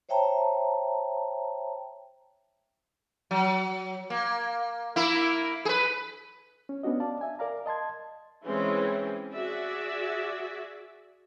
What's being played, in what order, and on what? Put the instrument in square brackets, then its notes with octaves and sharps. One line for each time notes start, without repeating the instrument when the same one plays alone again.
[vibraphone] C5 C#5 E5 G5 A5 A#5
[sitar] F#3
A#3
A#3 E4
G#4 B4
[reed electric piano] C#4
B3 C#4 D4 F#4 D#5
D5 F5 A5
E5 G#5
A#4 D5 F5 A#5
D#5 A5 C6 G#6
[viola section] E3 G#3 C4 C#4
F#4 G#4 D5 E5